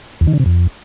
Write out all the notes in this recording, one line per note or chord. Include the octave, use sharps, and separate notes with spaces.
E2
D#3
D3
C3
F2